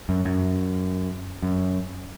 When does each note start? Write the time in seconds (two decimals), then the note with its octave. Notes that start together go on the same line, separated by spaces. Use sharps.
0.09 F#2
0.25 F#2
1.42 F#2